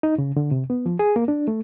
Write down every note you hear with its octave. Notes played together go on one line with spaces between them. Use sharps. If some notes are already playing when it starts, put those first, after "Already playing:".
D#4
C#3
D3
C3
B3
F3
G#4
A#3
D4
A3